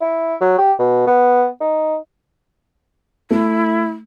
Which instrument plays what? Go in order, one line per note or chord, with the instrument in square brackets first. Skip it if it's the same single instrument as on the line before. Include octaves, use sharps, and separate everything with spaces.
[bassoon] E4
F#3
G4
B2
B3
D#4
[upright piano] A3 [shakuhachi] E4